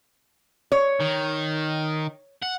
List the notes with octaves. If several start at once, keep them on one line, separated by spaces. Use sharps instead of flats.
C#5
D#3
F#5